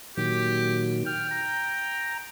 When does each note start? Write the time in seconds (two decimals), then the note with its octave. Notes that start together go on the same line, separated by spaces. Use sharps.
0.17 A#2 D#3 F#3 G4
1.06 G5 F6
1.31 A#5